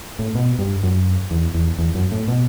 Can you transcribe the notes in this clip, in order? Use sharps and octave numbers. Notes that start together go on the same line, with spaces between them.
A2
B2
G2
F#2
E2
E2
E2
F#2
A2
B2